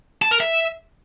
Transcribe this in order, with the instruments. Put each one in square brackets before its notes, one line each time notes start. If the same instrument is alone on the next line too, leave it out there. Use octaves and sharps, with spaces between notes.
[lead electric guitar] A5
A#4
E5